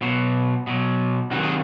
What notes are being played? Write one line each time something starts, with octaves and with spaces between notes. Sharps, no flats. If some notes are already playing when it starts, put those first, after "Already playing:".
B2 F#3
B2 F#3
C3 D#3 F#3 F#4
G#4